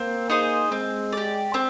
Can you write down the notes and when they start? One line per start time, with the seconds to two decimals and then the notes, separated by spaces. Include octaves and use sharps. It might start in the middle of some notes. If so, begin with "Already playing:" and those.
Already playing: A#3 C4
0.30 D#4 G#4 C5
0.71 G#3 C4
1.12 G4 D5
1.54 C4